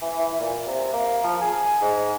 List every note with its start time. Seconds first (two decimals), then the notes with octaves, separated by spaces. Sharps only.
0.01 E3
0.19 E3
0.40 A#2
0.66 C3
0.93 A#3
1.24 F3
1.41 G#4
1.81 G#2